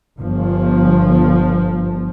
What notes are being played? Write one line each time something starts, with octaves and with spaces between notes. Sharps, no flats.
G1 F3